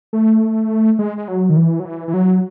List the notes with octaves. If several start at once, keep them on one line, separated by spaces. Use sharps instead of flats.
A3
G#3
G#3
F#3
D#3
E3
F#3
E3
E3
F#3